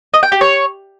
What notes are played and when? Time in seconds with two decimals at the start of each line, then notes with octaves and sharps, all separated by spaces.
0.14 D#5
0.23 G5
0.32 G4
0.41 C#5